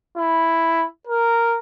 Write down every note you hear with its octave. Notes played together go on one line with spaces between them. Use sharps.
E4
A#4